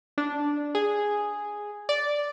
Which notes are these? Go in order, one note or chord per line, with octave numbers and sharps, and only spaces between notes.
D4
G#4
D5